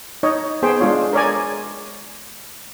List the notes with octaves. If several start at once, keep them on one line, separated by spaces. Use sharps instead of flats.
D#4 C#5 D#5
B3 G#4 C5 G5
G#3 D4 F4 C#5
A#4 C#5 D5 G#5